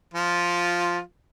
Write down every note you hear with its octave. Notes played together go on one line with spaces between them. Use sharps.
F3 F4